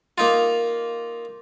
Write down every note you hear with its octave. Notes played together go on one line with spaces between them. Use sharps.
A#3 D#4 F4